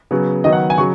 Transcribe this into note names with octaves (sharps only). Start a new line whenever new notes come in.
C#3 F#3 B3
D#3 F#3 B3 D#5
F#5
G#5
C#3 F#3 C#6